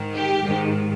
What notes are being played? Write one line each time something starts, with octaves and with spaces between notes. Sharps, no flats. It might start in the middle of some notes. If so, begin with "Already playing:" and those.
Already playing: G#2 D#3
G4
G#2 D#3